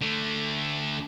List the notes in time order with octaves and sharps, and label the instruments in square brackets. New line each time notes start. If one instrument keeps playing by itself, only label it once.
[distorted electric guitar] D3 A3